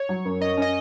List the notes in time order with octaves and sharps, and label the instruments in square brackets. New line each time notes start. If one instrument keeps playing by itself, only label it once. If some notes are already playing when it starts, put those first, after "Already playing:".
Already playing: [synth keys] C#5
[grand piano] F#3
F#2
[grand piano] F#2 [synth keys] D#5
[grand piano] C#4 [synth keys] D#5